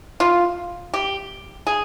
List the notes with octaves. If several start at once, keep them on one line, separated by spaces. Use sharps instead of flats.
F4
G4
G#4